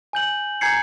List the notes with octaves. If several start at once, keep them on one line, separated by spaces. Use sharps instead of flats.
G#5 G6 F#7
G#5 A#5 G6 G#6 C7 C#7